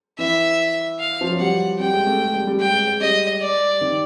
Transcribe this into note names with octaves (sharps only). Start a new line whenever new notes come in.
E3 E5
F5
F3
F#3
G3 F#5
G3 G5
G#3
A3
G#3
G3
G3
G#3 G5
G#3
G#3
G3 D#5
D5
D#3